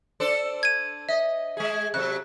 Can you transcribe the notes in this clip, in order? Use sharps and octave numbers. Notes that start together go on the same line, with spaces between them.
D4 A4 C5
G#6 D#7
D#5 E5
G#3 G#4
C3 F#3 A4 F#6